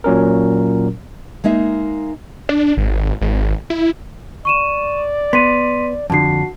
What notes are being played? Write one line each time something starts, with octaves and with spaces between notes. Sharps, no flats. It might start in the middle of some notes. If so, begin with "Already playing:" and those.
A#2 F#3 C#4 A#4
G#3 A#3 D#4 E5
D4
G#1
G#1
E4
D5 C#6 D#7 E7
B3 C6 B6 D#7
F2 D3 F#4 A5 C7